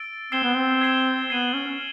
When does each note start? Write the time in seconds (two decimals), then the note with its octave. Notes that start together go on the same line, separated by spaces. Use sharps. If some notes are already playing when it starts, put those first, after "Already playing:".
Already playing: E6 A6 D7
0.32 C4 E6 G#6 C7 E7 G7
0.44 B3
0.56 C4
0.81 E6 G#6 C7 E7 G7
1.30 B3 G#6 C7 D#7 F#7
1.54 C#4
1.67 C#4